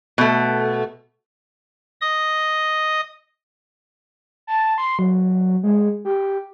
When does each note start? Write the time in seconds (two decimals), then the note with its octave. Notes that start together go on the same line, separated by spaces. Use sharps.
0.18 B2 A3
2.01 D#5 D#6
4.47 A5
4.78 C6
4.99 F#3
5.63 G#3
6.05 G4